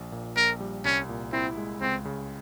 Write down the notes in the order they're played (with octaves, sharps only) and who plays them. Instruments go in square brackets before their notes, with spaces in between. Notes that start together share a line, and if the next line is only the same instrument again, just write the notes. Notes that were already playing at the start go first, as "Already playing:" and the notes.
Already playing: [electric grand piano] A#1
A#2
[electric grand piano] A#1 [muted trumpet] A#4
[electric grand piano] G3
[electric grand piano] C2 [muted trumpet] C#4
[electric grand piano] A#2
[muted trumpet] C4 [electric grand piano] E4
[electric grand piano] G#3
[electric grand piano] C#2 [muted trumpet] C4
[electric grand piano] C#3